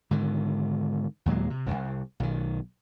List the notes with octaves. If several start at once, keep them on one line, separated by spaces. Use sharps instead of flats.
G#2 D3 D#3
D#2 A#2 F#3 G#3
C3
D#1 C2
B1 D#3